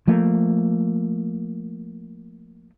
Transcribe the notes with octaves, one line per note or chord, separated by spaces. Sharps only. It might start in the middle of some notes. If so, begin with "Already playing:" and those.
F3 A3 A#3